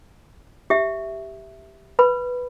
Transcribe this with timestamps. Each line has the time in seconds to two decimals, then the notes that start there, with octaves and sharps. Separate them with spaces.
0.70 G4 E5
1.99 B4 B5